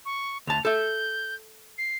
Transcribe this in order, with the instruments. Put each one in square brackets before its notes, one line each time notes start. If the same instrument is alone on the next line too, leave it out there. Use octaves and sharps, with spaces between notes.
[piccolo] C#6
[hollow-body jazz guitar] D2 A5 [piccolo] F7
[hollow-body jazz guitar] A4 E5 [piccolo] G6
[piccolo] C7